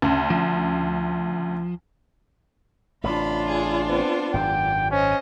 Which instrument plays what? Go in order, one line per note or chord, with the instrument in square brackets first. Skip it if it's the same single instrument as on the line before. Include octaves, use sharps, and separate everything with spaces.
[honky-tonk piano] D2 C#3
[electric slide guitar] F3
[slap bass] A1 C3 [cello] D4 F4 [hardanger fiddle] B5
[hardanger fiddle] G#4
B3 C4
[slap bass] G#1 F#2 [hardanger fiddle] G4 [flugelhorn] G5
[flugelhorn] C#4 [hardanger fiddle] C5 D#5